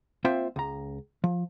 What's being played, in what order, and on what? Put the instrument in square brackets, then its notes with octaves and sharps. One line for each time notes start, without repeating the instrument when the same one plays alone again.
[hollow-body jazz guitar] A#3 C4 F4 C5 E5 G5
C#2 A#5
F3